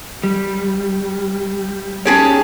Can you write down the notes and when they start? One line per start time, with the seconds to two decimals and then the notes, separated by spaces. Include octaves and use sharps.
0.24 G3
2.05 C#4 D#4 G4 G#4 C#5 A5